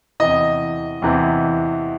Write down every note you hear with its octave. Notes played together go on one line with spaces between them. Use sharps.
E2 C3 E3 D#5
E2 C3 E3